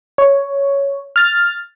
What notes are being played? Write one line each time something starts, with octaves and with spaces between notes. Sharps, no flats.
C#5
F6 A6